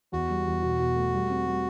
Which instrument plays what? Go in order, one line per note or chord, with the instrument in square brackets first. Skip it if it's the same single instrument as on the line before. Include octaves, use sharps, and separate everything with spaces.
[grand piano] E2 [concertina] F#4
[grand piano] G3
E2
B2
B2
A3
G3
C4
G3